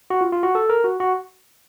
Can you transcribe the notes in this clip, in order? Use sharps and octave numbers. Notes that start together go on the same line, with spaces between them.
F#4
F4
F4
F#4
A4
A#4
F#4
F#4